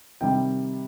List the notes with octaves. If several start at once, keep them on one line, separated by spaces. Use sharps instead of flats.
C3 D#3 G3 G5